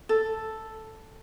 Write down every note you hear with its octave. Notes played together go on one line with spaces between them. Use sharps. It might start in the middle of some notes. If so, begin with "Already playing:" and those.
A4